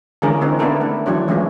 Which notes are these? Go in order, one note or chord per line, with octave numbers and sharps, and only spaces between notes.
D3 E3 G#3 C#4 G#4 A#4
D#3 C4 D#4
B3 D4 E4 A4 A#4
A3
E3 F#3 D4 C#5
E3 F3 G#3 A3 C#4